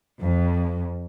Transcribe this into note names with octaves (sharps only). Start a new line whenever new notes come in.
F2